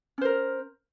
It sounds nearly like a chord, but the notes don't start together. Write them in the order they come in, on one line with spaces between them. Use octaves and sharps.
C#4 C5 A#4